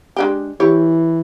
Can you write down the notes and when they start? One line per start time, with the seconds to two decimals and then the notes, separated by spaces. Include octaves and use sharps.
0.16 G#3 D4 G4
0.60 E3 E4 G4 C#5